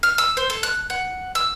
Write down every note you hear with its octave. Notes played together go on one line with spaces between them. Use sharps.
F6
E6
C5
A4
F#6
F#5
E6